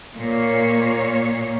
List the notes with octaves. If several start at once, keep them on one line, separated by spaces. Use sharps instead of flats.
A#2 A#3 C#5